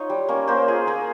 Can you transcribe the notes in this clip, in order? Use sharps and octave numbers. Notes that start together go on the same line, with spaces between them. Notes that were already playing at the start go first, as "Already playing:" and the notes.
Already playing: D#4 F4 C#5
G3
A#3 C#4
A#3 C5
F4 G#4
A#3 G#4